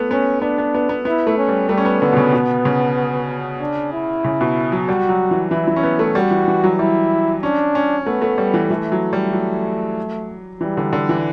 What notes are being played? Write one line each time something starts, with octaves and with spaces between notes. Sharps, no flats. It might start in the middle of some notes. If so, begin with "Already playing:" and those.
Already playing: A3 B3
B3 C#4
B3 D4
B3
B3
B3
B3 E4
A3
C#4
G3
G3 A3
C#4
B3
D3 B3
B2
C#3
B2
C#3
D4
E4
C#3
B2
F#3
G3 F#4
F#3
E3
E3 E4
E3
C#4
B3
A3
G3 F#4
E3
E3
F#3
G3 E4
C#4 D4
C#4
A3 B3
A3
G3
E3
E3 A3
F#3
G3
F#3
E3 G3
D3
D3
E3